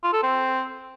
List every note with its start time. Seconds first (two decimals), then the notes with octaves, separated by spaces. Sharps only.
0.03 F4
0.13 A4
0.23 C4